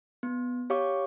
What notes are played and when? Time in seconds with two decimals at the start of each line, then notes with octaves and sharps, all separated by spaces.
0.23 B3
0.70 G4 C#5 F5 C#6 D6